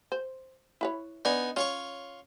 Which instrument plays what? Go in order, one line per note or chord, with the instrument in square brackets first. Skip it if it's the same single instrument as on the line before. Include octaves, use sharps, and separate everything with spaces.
[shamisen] C5
E4 B4 C#5
[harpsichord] B3 D#4 G#5 [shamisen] D4
[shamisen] C#4 [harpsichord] F4 C#5 C#6